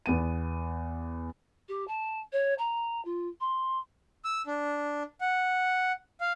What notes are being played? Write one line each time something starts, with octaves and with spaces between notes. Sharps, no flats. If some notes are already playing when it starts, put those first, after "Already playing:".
E2 B3 D#7
G4
A5
C#5
A#5
F4
C6
E6
D4
F#5
F5